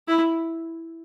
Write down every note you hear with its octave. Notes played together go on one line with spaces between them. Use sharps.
E4